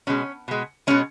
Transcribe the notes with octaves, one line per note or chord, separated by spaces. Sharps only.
B2 G#3 C#4
B2 G#3
B2 G#3 C#4